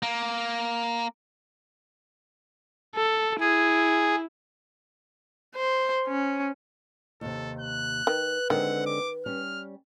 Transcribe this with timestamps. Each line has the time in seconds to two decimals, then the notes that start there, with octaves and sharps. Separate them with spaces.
0.02 A#3
2.95 A4
3.40 E4 G#4
5.55 C5
6.08 C#4
7.21 D#2 C3 A4
7.60 F#6
8.07 D#3 B4
8.50 D3 D#3 G#3 C4 F#5
8.86 D6
9.26 G3 C#4 F6